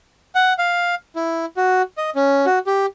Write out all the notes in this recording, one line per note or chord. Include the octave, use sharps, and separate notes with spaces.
F#5
F5
E4
F#4
D#5
C#4
F#4
G4